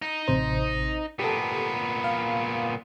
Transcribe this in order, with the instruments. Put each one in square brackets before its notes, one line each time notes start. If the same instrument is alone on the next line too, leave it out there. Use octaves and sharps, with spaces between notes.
[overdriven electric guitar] D#4
[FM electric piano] A1 C3 C5
[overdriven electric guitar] A#2 B3 [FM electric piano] G4 A4
[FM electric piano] F5